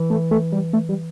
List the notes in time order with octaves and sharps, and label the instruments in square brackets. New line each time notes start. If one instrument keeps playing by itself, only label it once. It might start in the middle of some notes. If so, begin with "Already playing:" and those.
Already playing: [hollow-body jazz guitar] E3
[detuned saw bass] A3
A3
G3
A3
G3